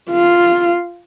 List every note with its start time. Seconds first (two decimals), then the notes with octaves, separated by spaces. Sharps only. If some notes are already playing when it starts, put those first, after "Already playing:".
0.11 F4